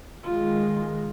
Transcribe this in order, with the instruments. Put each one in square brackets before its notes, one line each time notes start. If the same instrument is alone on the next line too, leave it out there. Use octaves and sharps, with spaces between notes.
[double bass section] D#3 G#3 [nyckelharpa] F4